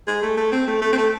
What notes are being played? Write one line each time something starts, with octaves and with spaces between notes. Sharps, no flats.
G#3
A3
A3
C4
A3
A3
C4
A3